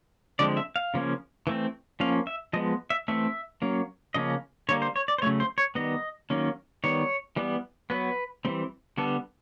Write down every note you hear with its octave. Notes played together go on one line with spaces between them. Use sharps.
D3 F3 G#3 C4 D5
E5
F5
C#3 F3 A#3 C#4
E3 A3 C4
F3 A#3 C#4 F5
E5
F3 G#3 B3 D#5
E5
E3 A3 C4 E5
F#3 A#3 C#4
C#3 F3 A#3 C#4 D#5
D3 G3 A#3 C#5
C5
C#5
D5
C5
C#3 F#3 A3 C#5
C5
C#5
D#3 G3 B3 D#5
D#3 F#3 A#3 C#4
D#3 G3 B3 C#5
E3 G3 B3
F#3 B3 B4
E3 G3 C4
D3 G3 B3 A4